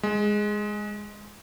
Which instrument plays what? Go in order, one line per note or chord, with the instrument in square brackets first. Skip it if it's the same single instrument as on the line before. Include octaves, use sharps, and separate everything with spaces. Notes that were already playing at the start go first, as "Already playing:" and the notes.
[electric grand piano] G#3